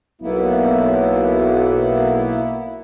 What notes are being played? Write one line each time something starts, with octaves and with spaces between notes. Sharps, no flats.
B1 A#3 B3 E4